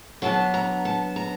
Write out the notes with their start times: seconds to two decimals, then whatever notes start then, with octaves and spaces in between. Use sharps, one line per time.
0.22 F#3 B3 D4 A5
0.54 A#5
0.85 A5
1.16 A#5